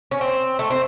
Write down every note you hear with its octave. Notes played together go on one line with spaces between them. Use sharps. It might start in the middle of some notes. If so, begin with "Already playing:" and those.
C#4
C4
A3
C4